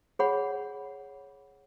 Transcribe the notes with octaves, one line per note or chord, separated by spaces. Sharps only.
G#4 C#5 F#5 B5